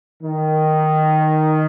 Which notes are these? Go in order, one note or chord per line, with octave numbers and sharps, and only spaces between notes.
D#3